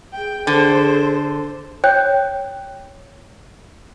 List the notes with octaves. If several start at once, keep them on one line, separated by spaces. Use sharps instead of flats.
G#4 G5
D3 G#4 A4 C5
C#5 G5 F#6 G6